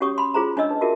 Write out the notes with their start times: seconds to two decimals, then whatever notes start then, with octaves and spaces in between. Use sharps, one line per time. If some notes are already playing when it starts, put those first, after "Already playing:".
0.01 C#4 F#4 G4 C#5 C#6 D#6
0.18 B5 C6
0.34 F4 G#4 C5 A#5
0.57 D4 C#5 D#5 E6
0.70 D#4 B4
0.81 F4 F#4 G#4 A#4 E5